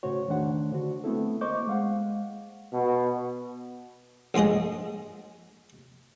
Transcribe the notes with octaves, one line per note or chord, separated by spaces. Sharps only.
A2 C#3 F#4 C5 C#5
E2 D#3 A3 D4 C5 F#5
D3 F#4
A3 B3 C4 E4 A4
A#3 C5 D#5 C#6 D6 G6
G#3 F5 F#5
B2
A#1 G#2 G#3 G#4 D#5